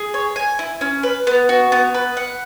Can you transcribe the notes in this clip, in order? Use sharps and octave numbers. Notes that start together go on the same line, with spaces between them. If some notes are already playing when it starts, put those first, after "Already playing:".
Already playing: G#4
C#5
G#5
E4
C#4
B4
B3
F#4
B3
B4
F#5